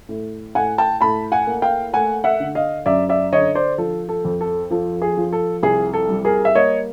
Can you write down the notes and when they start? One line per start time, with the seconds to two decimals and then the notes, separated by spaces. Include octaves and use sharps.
0.09 A2
0.55 A2 F#5 G#5
0.78 G5 A5
1.01 A2 A5 B5
1.32 F#5 G#5
1.47 A#3
1.62 F5 G5
1.93 A3 F#5 G#5
2.24 E5 F#5
2.40 D3
2.55 D#5 F5
2.86 F#2 D5 E5
3.09 D5 E5
3.32 D3 C#5 D#5
3.55 C5 D5
3.78 F3 A4
4.09 A4
4.25 F2
4.41 A4
4.71 F3 A4
5.02 G#4
5.17 F3
5.33 A4
5.63 C2 G#4
5.94 A4
6.09 G3
6.25 G#4 A#4
6.45 E5
6.55 A#3 C#5 D#5